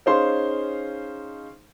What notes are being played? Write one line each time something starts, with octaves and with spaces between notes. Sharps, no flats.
C#4 D#4 G#4 C5 F5 C6